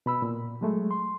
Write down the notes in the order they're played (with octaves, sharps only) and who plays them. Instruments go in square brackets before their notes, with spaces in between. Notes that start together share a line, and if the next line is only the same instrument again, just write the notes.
[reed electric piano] B2 B5 E6
A#2
F#3 G#3 A3
C6